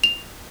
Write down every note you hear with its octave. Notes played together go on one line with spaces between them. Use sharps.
F7